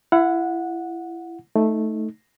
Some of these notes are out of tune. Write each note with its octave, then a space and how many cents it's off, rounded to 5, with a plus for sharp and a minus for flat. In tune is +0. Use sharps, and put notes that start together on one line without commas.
E4 +25 F#5 -15
A3 +0 D#4 +15